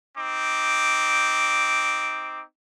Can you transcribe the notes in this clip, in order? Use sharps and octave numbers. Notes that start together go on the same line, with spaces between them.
C4 D#4 D6